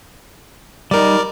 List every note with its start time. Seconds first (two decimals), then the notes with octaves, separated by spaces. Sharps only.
0.91 G3 D#4 A#4 D5